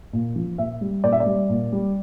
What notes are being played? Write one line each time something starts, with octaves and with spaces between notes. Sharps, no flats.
A#2
F3
A#2 E5
G3
A#2 D5
E5
D5
G3
A#2
G3